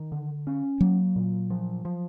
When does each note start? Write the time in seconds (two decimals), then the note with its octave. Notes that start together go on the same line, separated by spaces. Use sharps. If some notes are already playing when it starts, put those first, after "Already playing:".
Already playing: D#3
0.12 D3
0.47 C#4
0.81 F#3 A#3
1.16 A#2
1.50 F3
1.85 F3